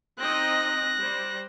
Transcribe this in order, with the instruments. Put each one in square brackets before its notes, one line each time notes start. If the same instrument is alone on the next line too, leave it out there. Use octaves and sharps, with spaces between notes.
[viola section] C4 D#4 D#5 [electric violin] F#6 A#6
[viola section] G3 C5